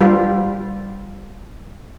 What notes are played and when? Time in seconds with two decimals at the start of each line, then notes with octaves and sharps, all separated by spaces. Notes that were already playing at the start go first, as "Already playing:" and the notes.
0.01 G3 F4